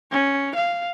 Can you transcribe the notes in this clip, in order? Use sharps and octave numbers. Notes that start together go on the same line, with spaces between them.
C#4
F5